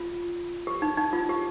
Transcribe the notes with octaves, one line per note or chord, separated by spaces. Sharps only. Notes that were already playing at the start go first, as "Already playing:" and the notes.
Already playing: F4
G4
D#4
D#4
F4
G4